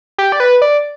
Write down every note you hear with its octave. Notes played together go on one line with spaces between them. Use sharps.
G4
D5
B4
D5